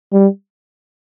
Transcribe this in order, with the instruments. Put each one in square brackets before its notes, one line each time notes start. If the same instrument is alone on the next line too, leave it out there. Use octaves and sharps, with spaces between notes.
[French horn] G3